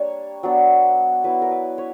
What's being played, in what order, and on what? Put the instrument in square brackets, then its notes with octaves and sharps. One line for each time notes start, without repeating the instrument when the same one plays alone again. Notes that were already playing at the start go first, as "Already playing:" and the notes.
Already playing: [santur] G3 A#3 D4 C#5
F#3 B3 D4
F#3 B3 E4 B4
A#4
B4
C#5